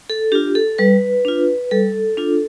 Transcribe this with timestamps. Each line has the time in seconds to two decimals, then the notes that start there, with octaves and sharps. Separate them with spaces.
0.10 A4
0.32 D4 F4 G4
0.55 A4
0.78 G3 B4
1.25 D4 F4
1.71 G3 A4
2.17 D4 F4